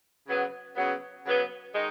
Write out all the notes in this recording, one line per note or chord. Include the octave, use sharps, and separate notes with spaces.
C#3 F#3 B3
C#3 F#3 B3
C#3 F#3 B3
D#3 G#3 D#4